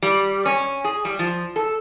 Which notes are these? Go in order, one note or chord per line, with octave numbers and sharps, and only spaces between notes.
G3
C#4
G#4
G3
F3
A4